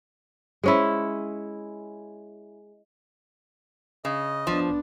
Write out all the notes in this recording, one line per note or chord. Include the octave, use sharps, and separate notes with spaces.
G#3 C#4 E4
C#3 D#5
F3 B3 D4